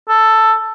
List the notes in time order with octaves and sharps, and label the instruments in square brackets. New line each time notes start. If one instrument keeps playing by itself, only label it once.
[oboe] A4